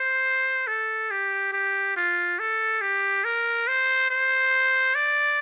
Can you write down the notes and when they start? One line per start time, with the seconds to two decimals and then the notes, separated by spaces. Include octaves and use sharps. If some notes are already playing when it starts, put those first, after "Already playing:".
Already playing: C5
0.67 A4
1.11 G4
1.53 G4
1.97 F4
2.39 A4
2.81 G4
3.25 A#4
3.68 C5
4.11 C5
4.95 D5